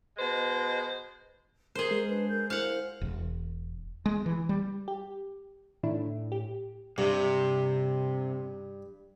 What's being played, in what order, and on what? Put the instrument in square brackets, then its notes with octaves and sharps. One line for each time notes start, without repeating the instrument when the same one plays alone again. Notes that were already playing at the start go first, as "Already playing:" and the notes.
[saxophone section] B2 G#3 C5
[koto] G#4 C5 [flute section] A#4
[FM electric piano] G#3
[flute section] D4 B4
A#4 G6
[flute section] E4 A#4 C5 [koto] F5 F#5
[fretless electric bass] E1
G#3
E3
G3
[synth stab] G4
[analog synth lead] A2 [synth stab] D#3 D4 E4
[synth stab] G4
[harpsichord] G2 [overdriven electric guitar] C3